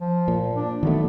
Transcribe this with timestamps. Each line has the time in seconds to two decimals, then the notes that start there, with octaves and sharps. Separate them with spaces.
0.01 F3
0.28 A#2
0.55 D4
0.83 D#3 F#3 A3 B3